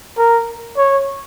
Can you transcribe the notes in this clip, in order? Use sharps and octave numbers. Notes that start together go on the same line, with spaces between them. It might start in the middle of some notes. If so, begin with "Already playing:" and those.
A#4
C#5